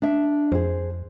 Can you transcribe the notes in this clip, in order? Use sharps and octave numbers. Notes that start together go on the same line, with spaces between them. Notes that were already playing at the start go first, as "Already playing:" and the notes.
D4 E5
F2 G#4 C5